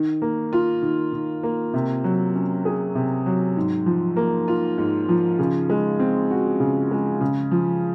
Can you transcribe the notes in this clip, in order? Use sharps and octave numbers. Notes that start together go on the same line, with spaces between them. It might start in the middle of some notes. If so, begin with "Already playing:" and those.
Already playing: D#3
A#3
F4
D#3
D#3
A#3
C3
F#3
C#4
G#4
C3
F#3
G#2
F3
A#3
F4
G#2
F3
C#3
G#3
C4
F#4
C#3
G#3
C#3
F3